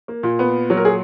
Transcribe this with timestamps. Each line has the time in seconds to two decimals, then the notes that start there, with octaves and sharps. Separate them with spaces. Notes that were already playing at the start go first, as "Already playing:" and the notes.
0.08 A#3
0.23 A#2
0.39 B3
0.70 F#3
0.77 A#4
0.85 G#4